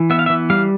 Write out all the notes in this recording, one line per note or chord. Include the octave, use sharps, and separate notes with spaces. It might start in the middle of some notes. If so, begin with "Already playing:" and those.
Already playing: E3
B3 E5
F5
E5
E3
G3 F5